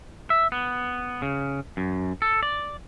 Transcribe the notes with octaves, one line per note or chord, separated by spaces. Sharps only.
E5
B3
C#3
F#2
A4
D5